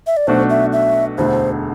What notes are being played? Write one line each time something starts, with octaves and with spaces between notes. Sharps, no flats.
E5
D5
B1 B2 A3 D4 F#4 C5
E5
E5
E1 D2 D3 A3 C5